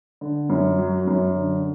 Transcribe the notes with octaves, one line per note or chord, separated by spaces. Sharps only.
D3
F#2
F#3
F#2
D3